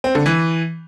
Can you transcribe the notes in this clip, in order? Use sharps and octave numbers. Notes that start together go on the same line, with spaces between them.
C4
D3
E3